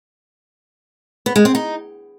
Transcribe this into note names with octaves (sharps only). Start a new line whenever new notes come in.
B3
G#3
C4
D#4